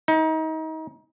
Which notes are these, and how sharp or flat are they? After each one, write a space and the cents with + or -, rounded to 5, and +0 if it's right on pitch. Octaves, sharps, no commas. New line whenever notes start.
D#4 +30